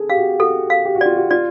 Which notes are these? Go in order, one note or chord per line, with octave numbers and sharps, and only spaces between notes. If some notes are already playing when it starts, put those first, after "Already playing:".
Already playing: G#4 A4
G4 F5
F#4
F#4 A4
F5
G4
F#4
F4 D5
F#4
F4 D5